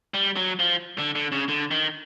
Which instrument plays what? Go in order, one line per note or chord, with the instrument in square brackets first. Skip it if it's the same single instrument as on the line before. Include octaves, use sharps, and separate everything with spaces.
[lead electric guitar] G3
F#3
F3
D3
D3
C#3
D3
D#3